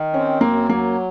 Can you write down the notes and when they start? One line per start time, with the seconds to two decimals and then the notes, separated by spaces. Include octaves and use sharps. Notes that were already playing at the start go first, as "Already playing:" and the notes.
Already playing: D#3
0.13 C4 C#4
0.41 F#2 A#3
0.69 F#3 A#3